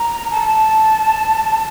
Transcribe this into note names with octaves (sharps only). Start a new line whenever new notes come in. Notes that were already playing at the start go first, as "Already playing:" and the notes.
Already playing: A#5
A5